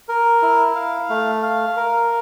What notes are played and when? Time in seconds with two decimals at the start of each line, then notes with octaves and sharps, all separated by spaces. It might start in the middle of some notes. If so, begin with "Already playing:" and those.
0.09 A#4
0.42 E4
0.75 F5
1.10 A3
1.43 F5
1.77 A#4